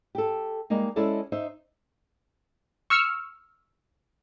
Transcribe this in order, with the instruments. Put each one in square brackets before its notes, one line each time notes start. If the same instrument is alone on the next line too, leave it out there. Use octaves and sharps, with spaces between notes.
[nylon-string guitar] G4 A4
G3 G#3 A#3 D#4
G#3 C#4 E4 A4 D5
D#4 C5 E5
[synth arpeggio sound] C#6 E6 F6 C#7